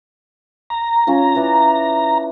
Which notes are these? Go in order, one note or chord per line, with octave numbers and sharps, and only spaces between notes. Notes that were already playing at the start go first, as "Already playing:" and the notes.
A#5
C#4 F4
E4 B4 D5